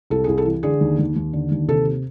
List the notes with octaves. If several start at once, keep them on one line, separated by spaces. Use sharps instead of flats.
C2 A4
C2 G#4
A4
E3
D3 G#4
D#2
D#2
D#2
D3
D#2
C3 A4